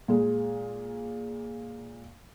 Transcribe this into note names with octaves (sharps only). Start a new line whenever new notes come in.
A#2 G#3